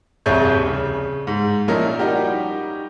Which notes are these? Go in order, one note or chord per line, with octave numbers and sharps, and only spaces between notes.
D#1 C2 F2 G#4 C#5 G6
C#3
G#2
A#2 F3 C#4 D#4 E4 A#4
G3 D#4 F#4 G4